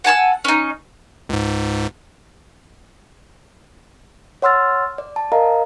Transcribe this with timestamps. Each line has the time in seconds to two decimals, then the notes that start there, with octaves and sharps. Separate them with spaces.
0.04 F#5 G#5 A5 E6
0.45 C#4 D#4
1.29 C#2 G#2
4.42 C#5 F#5 C6 E6 F6 A6
4.98 D5
5.16 A5
5.32 A#4 D#5 F5 A#5